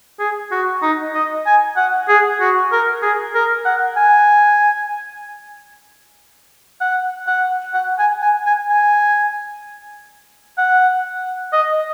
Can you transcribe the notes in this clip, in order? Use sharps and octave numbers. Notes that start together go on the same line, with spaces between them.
G#4
F#4
D#4
D#5
G#5
F#5
G#4
F#4
A#4
G#4
A#4
F#5
G#5
F#5
F#5
F#5
G#5
G#5
G#5
G#5
F#5
D#5